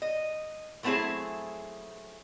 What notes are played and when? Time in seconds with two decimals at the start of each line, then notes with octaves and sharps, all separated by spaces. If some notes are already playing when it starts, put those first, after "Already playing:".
0.02 D#5
0.83 F#3 A3 B3 C4 E4 G#4